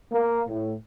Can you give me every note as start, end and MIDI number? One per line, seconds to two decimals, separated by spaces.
0.12 0.42 58
0.49 0.74 45